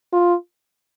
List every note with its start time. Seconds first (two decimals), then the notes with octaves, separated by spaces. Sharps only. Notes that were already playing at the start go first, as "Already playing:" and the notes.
0.13 F4